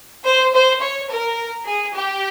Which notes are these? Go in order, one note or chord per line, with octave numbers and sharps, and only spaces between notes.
C5
C5
C#5
A#4
G#4
G4